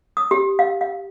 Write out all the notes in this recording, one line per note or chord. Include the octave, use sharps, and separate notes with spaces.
D#6
G4
F5
F5